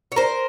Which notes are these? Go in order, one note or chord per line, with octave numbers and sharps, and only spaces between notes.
C#5
A#4 C5